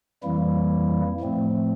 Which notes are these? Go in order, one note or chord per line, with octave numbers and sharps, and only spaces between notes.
F2 E3 G3 A#3 E4
A2 F3 A3 C4